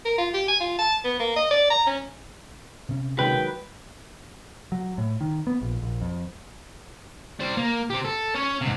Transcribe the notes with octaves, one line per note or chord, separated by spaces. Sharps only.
A#4
F4
G4
G#5
F4
A5
B3
A#3
D#5
D5
A#5
C#4
C3 C#4
D#3 F#3 G#3 B4 G5
F#3
A2
D#3
B3
A#1
A#1
F2
G3 C5
A#3
C4 G4
A4
C#4 C#5
G#2 C3